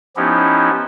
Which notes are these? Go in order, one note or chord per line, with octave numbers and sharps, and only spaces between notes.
F3 B3 C#4 D#4 E4 G4